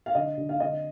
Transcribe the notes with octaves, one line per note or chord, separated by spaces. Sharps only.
F5
D3 D#5
D3
F5
D3 D#5